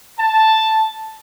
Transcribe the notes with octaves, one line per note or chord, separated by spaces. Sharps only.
A5